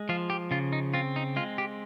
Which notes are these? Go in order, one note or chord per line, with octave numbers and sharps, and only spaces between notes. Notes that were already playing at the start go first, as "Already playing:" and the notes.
Already playing: G#3
F3 F4
G4
C#3 F4
D#4
C4 F4
D#4
G#3 F4
G4